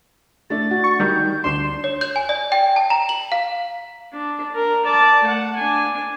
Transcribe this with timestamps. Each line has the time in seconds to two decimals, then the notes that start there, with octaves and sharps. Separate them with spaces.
0.50 A3 D4 A6
0.71 F#4
0.84 C#6
1.00 D#3 G3 G6
1.44 D2 D4 C6 E7
1.84 C#5
2.01 G6
2.16 G#5
2.29 D5
2.52 G5
2.76 A5
2.90 A#5
3.09 F#7
3.32 F5
4.13 D4
4.55 A#4
4.86 D5 A5
5.23 A3 F#5
5.56 D4 G#5